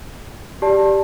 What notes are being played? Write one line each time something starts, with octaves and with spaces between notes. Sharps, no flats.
G4 D5 A5